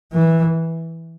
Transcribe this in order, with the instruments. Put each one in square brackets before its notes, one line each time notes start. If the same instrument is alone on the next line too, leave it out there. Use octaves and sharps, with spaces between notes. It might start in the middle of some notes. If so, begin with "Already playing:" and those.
[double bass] E3